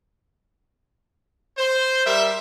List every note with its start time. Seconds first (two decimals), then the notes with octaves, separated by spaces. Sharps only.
1.58 C5
2.05 G3 A#4 E5